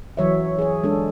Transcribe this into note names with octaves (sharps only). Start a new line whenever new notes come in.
E3 F#3 C#5 E5
G#4 C#5
G#3 D4 A4